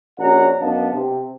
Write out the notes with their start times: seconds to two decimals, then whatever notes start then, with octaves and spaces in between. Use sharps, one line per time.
0.19 A#1 C#4 F#4 D5 F#5 A#5
0.60 F#2 B3 D4 D#5 F5 A5
0.93 C3